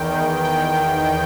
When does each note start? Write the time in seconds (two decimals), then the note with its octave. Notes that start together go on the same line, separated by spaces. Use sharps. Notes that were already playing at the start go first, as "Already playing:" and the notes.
Already playing: E2 D#3 G5
0.43 G5